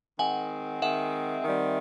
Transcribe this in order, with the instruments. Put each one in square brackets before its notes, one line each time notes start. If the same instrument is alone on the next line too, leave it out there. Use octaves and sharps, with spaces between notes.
[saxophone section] D#3 G#3 C4 [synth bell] F#5 G#5
[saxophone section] D#3 G#3 C4 [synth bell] E5 F#5
[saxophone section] D#3 G3 C4